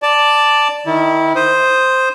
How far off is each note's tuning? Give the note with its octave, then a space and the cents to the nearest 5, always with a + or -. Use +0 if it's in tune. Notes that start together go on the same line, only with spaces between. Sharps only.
D5 +0 A5 +0
D#3 +0 E4 -20
C5 +0 D#6 +0